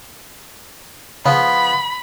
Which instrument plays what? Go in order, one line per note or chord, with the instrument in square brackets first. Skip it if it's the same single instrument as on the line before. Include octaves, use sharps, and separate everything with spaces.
[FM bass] C#3 [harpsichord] F3 B3 [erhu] B5